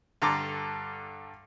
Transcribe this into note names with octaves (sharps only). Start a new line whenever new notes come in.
G2 D3 A4 A#5 C6 D6